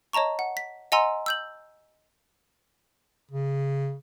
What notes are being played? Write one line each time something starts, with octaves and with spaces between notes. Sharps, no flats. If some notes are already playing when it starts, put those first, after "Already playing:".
C#5 D#5 A5 A#5 C#6
F#5
B6
D#5 F#5 G#5 A#5 C6 E6
E6 G6 F#7
C#3